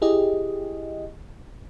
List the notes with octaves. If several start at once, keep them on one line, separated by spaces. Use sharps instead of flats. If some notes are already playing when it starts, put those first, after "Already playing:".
E4 G4 G#4 D#5